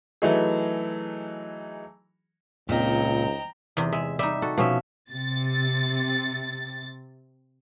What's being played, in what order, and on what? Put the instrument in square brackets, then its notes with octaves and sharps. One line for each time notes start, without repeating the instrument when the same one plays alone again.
[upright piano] E3 F#3 A3 D#4 G#4
[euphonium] C#2 [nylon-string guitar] A#2 [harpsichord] C4 D#4 G#4 [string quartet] G5 A#5
[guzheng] E2 C3 C4
[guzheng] G#3 [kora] E5
[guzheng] G3 D#4 [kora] E5
[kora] F#4 [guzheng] A4
[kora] B2 C#4 E5 [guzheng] F3
[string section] C3 A6